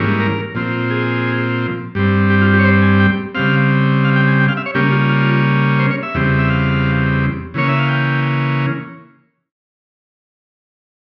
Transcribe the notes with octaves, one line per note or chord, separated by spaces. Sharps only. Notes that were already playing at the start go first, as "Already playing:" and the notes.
Already playing: G#2 E3 G3 A#3 C#4
A#4
A#2 F3 C4
G#4
G2 G3 C4
G4
F4
G4
C#5
C5
G#5
G5
C#3 G3 C4 F5
F5
G5
G#5
G5
F5
E5
C#5
C#3 G3 A#3 C#4 G4
F4
F4
C5
C#5
E5
E2 C#3 G3 C4
E5
F5
C#3 E3 A#3 C#4 C#5
E5
F5
G5